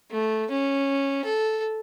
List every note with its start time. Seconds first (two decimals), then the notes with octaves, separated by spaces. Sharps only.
0.11 A3
0.51 C#4
1.25 A4